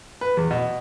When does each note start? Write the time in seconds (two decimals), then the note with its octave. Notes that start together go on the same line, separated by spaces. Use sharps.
0.21 B4
0.37 E2
0.51 B2